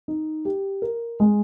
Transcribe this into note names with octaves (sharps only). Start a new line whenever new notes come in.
D#4
G4
A#4
G#3